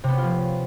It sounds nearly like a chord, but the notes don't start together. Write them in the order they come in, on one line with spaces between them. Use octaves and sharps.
C3 B3 C#4 F4 F3